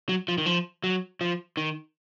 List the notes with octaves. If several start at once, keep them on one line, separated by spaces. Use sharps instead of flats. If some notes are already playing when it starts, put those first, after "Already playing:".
F#3
F3
D#3
F3
F#3
F3
D#3